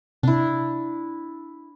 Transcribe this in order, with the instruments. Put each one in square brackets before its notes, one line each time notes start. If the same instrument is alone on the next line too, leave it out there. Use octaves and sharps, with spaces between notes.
[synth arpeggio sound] C3 [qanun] D4 E4